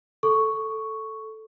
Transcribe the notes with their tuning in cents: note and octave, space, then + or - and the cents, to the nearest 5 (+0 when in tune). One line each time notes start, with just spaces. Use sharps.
A4 +0 C#6 +0